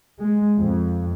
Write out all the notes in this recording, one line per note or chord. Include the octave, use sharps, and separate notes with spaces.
G#3
F2